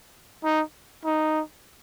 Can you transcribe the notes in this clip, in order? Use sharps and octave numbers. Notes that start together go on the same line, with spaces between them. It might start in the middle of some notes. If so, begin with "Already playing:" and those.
D#4
D#4